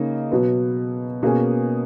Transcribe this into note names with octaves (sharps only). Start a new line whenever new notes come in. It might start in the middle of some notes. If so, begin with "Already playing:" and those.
Already playing: C#3 A#3 D#4
B2 F#3 B3
B2 A#3 C#4 G#4